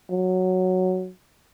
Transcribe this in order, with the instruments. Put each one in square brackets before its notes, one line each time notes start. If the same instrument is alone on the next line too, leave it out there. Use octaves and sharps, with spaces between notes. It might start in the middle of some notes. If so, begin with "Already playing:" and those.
[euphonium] F#3